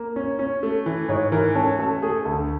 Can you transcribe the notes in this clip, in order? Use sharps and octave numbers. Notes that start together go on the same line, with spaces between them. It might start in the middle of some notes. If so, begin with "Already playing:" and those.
Already playing: A#3
C#4
C#4
A3
E3
G#2 C#5
E3 A#4
C#4 A4
A3 A4
A3 G#4
D2 A4